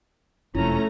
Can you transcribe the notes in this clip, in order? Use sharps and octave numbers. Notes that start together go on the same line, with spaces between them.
F#1 F2 C3 A3 C#4 E4 F4 A#5